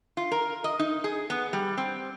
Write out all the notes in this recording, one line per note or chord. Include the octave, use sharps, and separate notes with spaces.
F4
A#4
D#5
D#4
G#4
B3
G3
C4